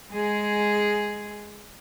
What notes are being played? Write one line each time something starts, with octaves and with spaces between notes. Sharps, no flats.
G#3 G#4